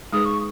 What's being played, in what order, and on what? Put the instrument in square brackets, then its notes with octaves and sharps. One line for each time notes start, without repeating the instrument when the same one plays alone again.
[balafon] G#3 D#4 G#4 B4 [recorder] D#6
[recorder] C#6